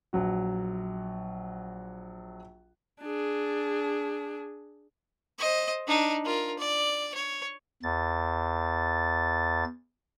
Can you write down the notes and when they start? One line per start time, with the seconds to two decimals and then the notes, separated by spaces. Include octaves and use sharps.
0.13 A#1 F#3 F#4
3.03 D4 G#4
5.39 C5 D#5
5.87 D4 D#4
6.25 F4 A#4
6.59 D5
7.14 C#5
7.83 E2 A6